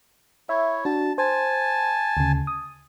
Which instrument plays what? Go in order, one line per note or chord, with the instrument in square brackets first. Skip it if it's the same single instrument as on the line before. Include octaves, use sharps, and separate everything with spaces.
[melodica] E4 C#5 [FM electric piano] E5
[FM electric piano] D4 F#4 [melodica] A5
[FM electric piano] C5 [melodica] G#5 A5
[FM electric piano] D2 C#3
D#6